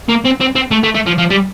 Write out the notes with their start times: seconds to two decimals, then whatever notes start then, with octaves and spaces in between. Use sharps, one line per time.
0.09 A#3
0.25 C4
0.41 C4
0.56 C4
0.71 A3
0.83 A3
0.95 A3
1.06 F3
1.18 F3
1.30 G3